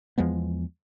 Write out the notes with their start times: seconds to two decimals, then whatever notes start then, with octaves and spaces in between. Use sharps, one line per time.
0.18 E2 F3 G#3 B3